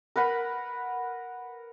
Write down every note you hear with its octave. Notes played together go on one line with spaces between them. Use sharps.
A#4 B4 F#5 B5